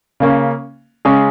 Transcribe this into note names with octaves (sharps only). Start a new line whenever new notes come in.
C#3 A#3 C#4
C#3 G#3 C#4 G#4